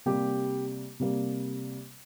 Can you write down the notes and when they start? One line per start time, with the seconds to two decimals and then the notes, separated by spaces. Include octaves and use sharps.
0.06 C3 G3 A#3 G4
1.00 C3 G3 A#3